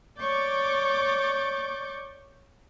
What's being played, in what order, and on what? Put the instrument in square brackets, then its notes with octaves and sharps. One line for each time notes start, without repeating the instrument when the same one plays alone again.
[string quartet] C#5 D5 C#6 D6 G6 A6